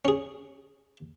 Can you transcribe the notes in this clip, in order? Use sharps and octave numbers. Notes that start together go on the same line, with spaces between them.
C#4 G#4